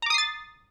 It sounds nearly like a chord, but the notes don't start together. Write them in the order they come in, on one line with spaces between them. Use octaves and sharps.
A#5 D6 D#6 C7 A6